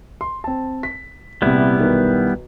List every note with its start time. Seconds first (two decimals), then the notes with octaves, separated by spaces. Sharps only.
0.21 C6
0.44 C4 A5
0.83 B6
1.42 A#1 C3 G3 B3 E4
1.79 B1 D#3 B4